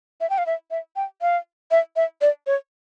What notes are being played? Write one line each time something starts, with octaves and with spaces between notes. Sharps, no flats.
E5
G5
F5
E5
E5
G5
F5
E5
E5
D5
C#5